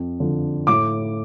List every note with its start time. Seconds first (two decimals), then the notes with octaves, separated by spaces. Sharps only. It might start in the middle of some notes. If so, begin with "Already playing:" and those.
Already playing: F2
0.20 D3 F3
0.67 A2 D6